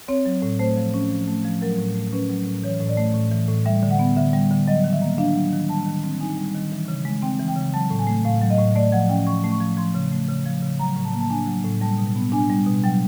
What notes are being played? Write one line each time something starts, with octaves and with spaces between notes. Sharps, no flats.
C4 C#5
F#3
A2
A3 C5
F3
C#4
F3
A3
F3
F#3 A#4
A2
A3
C#4 B4
F#3
A2
E3 C#5
A2
D5
A3
A2
E3
A2
G3 E5
D3
F#5
B3
D3 E5
G3
D3
F#3 D#5
D#3
E5
A#3
D4 F5
F#3
D#3
G3 A5
D#3
C4
D#4 G#5
G3
D#3
E3
C#3
G#3
C4 G5
E3
G5
C#3
F#3 A5
A2
G#5
A3
A2 F5
F#3
D#5
A2
A3 D5
F3 F#5
C#4 G5
F3 C#6
A3
C#6
F3
F3 C6
C#3
A3
C#3
F3
C#3
F#3 A#5
A2
A5
A#3
A5
D4 G#5
F#3
A2
G3 A5
B2
B3
D4 G#5
G3
B2
F#3 G5